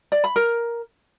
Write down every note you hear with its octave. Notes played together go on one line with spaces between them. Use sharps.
D5
B5
A#4